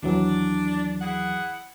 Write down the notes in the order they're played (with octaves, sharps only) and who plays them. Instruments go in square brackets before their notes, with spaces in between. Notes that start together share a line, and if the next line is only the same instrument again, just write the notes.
[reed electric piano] D#2 E3 F#3 [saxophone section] D4
[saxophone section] E4 G#4 F#5